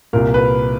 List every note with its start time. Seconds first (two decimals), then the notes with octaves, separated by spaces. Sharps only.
0.13 C2 A#2 A#4
0.34 B4